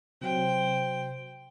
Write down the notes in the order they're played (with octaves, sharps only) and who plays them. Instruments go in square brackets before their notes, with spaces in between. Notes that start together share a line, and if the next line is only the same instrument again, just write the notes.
[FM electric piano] C3 F#3 [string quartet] C5 G5